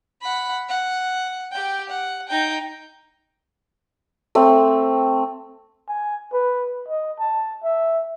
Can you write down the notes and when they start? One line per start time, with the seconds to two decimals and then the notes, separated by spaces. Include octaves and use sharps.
0.21 F#5 B5
0.69 F#5
1.52 G4 G5
1.89 F#5
2.29 D#4 G5
4.35 A3 C4
5.89 G#5
6.33 B4
6.88 D#5
7.19 A5
7.63 E5